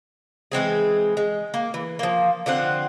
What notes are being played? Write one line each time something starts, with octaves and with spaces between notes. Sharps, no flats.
E3 G#3 C4 G#4
G#3
A#3
E3
F3 A#3
D3 F3 C4 F#5